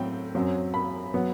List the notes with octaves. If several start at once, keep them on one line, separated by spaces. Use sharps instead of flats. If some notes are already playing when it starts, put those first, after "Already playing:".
Already playing: A2 F#3 C4 G5
F#2 F#3 C4
B5
F#3 B3